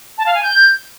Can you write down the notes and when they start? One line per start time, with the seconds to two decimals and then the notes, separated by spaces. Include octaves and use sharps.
0.18 A5
0.26 F5
0.34 G#5
0.43 G6